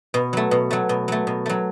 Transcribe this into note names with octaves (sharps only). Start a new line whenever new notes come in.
B2
F#3 A3
B2
F#3 A3
B2
F#3 A3
B2
F#3 A3